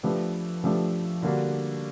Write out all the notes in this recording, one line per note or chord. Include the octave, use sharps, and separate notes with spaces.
F3 A3 D4 G4 B4
F3 A3 D4 G4 B4
D3 G3 A#3 D4 F#4